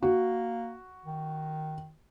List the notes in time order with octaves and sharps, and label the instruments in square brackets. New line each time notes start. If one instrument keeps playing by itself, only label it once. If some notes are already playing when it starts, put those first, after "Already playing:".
[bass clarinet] A#3 [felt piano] F#4
[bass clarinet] D#3